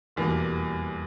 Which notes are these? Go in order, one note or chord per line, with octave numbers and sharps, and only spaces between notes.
F1 E2 B2 G3 A#3